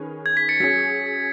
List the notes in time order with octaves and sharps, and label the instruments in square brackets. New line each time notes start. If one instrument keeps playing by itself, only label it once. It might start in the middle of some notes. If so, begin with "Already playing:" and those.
Already playing: [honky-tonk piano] D#3 C#4 G#4 B4
[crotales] G#6
B6
A6 C#7
[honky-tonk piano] F#3 C#4 G#4 [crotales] B6